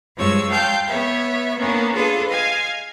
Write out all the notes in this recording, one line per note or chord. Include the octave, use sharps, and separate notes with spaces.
G2 F3 G#3 C#5 E6
F5 G5 A5 C6 G6
B3 C#5 E5
A#3 B3 C#4 D4
D4 F4 G#4 A4 B4
D#5 F5 G#5